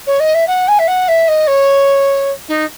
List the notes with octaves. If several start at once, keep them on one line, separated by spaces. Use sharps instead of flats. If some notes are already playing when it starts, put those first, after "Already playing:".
C#5
D#5
E5
F#5
G#5
E5
F#5
E5
D#5
C#5
D#4